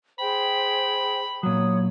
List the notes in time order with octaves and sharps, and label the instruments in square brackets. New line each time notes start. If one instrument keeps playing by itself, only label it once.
[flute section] G#4 C5 G5 [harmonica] B5
[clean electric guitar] A#2 F#3 [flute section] C#5 D#6